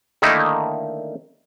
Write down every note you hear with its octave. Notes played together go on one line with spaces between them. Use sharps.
D3 D#3 A3 A#3 D#4 E4